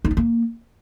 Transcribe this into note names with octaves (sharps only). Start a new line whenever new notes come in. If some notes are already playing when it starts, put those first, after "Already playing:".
D#4
B3
A#3